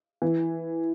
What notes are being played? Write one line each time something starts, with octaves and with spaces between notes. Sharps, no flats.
E3